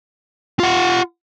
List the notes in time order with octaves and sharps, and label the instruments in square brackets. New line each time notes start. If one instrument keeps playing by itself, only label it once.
[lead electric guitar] F4 F#5